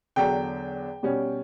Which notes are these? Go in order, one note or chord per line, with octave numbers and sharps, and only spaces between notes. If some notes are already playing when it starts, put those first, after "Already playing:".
E2 D3 F#3 G5
B2 G3 C#4